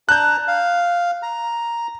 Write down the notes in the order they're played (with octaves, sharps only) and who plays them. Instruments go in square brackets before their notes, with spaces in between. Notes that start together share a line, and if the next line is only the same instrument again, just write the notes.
[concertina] D4 A5 A#5 [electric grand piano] F#6 G6
[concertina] F5
A#5